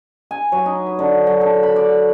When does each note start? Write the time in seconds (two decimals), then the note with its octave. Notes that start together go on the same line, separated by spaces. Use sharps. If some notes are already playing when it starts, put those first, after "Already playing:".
0.31 G#5
0.52 F#3
0.66 D#4
0.86 B4
0.99 D3
1.27 F#3
1.41 A4
1.63 B5
1.76 D5